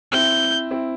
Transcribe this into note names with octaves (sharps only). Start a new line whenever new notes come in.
C4 E4 G6
C4 E4